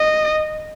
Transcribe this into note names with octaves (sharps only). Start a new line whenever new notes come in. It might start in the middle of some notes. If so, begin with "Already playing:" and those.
Already playing: D#5